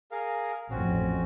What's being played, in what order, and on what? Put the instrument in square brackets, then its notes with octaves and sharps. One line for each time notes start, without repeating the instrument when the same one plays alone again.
[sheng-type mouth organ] G#4 A#4 F5
[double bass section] A1 F2 [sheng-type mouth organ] C4 C#4 F#4